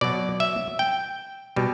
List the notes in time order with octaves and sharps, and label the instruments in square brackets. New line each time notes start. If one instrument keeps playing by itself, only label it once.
[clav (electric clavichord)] B2 F#3 D5
E5
G5
B2 G3